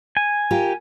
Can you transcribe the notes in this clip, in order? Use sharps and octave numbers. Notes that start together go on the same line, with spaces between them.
G#5
F4 G4 A#4